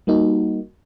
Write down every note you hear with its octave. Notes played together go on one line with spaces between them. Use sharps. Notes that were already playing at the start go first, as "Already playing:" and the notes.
G3 A#3 D#4 F#4